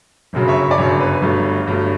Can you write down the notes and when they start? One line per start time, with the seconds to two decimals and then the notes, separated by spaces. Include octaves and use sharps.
0.33 G1 F#2 C#3 F#3
0.48 C#5 E5
0.62 C#5
0.71 D5
0.78 G1 F#2 C#3 F#3 C#5
1.00 B4
1.22 G1 G2 F#3 A3
1.67 G1 G2 F#3 A3